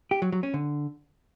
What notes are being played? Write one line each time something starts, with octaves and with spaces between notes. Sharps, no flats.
G4
F#3
F#3
C#4
D3